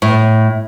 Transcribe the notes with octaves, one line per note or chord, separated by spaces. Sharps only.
A2